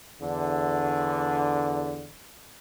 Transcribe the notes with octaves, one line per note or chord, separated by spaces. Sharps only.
E2 D3